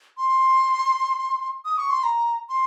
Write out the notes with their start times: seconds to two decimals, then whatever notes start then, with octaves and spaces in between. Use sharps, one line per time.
0.18 C6
1.65 D#6
1.78 C#6
1.90 C6
2.04 A#5
2.49 C6